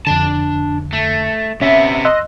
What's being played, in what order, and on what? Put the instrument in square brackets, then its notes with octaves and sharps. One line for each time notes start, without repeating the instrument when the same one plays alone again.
[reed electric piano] F2 D3 [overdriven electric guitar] D4 A5
[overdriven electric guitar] A3
[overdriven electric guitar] C3 B3 [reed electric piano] C#4 [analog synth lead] E5
[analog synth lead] D#5 [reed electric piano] C6 E6 F#6